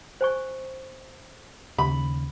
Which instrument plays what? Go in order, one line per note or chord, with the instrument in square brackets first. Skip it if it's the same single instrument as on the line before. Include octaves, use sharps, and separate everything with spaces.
[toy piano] C5 G#5 C#6
[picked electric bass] D#2 C#3 [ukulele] B5